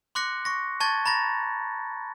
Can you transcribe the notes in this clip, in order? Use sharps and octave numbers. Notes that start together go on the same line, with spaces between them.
C6 D6 F#6 A#6 C#7
C#6 A#6
A5 C#6 G#6 A6
A#5 B5 A6 A#6